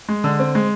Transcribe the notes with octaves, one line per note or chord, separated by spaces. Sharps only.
G#3
D3
C4
G#3